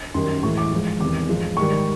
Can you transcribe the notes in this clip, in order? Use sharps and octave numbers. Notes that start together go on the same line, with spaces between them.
F#2 D#3 G3 C6
A2 E3 G#3 C#6
D6
G#2 F3 G#3
E2 C3 D#3 D6
G#2 F3 G#3
G#2 D#3 G3 C#6